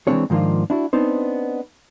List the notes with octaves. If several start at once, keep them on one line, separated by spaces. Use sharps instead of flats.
E3 F3 G#3 C4 D4 C#5
G#2 D#3 F3 A#3 D4 F4
D4 E4 F#4
B3 C4 D4 D#4 C5